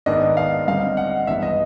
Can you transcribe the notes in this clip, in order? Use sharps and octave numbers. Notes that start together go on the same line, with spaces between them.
G#2 D#3 G#3 B3 D4 D#5
F5
D3 G3 C4 D#4 F5
F#5
G2 E3 G#3 B3 D#4 E5
D#5